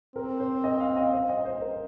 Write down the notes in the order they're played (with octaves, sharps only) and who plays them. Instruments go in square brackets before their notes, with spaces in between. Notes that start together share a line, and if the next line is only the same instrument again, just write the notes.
[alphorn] C4 [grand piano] A#4
[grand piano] C5
D#5
F5
D#5
C5
D#5
C5
A#4